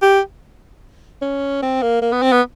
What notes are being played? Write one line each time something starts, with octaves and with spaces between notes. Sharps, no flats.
G4
C#4
C4
A#3
A#3
B3
C4
B3